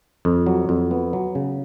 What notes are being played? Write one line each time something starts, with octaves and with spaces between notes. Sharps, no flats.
F2
F#3
F2
B3
F#3
C#3